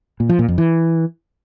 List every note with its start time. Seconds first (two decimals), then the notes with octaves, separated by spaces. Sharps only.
0.20 A#2
0.29 F3
0.39 A#2
0.48 F2
0.58 E3